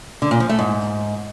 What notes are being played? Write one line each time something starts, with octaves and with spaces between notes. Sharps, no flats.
D3
A#2
F3
A3
G#2